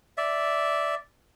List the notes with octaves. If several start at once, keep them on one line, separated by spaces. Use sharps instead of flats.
D5 E5